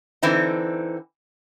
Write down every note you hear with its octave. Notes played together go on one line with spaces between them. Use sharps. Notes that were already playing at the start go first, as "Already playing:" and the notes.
D3 E3 C4 D#4